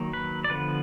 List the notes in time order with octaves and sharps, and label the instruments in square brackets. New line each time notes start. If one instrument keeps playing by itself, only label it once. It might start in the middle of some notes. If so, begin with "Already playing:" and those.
Already playing: [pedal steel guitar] D#3 F#3 A#3
B4
D5
D3 F3 B3 B4